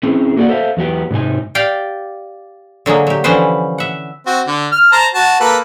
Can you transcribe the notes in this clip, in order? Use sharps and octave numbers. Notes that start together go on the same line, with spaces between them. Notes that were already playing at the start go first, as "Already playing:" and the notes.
C4 C#4 E4 G#4
A#3 F#4 A4 B4 D5 F#5
A4 C5 E5 F5
E2 F#3 B3 G4
G#2 C3 D#4 G#5
G4 D5 F5 G5
D3 F#3 G#3 A#3
F#3 G4
D3 E3 F3 C#4 B4 C5
E5 F#5
C4 F#4
D3
F6
C5 A5 A#5
F#4 A5
A#3 A4 B4